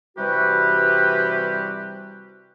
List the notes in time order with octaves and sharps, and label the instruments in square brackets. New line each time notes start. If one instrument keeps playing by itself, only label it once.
[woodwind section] C3 E3 G3 F#4 G4 B4